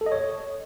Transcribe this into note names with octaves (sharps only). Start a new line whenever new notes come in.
A4
D#5
C#5